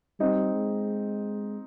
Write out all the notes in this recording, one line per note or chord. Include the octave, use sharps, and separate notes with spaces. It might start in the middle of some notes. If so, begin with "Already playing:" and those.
G3 C4 D#4
G#3